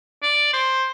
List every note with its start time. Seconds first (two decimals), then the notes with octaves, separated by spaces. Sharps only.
0.22 D5
0.53 C5